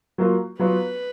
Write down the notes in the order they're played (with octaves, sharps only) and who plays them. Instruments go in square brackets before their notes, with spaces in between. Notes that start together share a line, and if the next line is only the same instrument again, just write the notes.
[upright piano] F#3 A#3 F4
[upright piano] F#3 B3 F4 [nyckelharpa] B4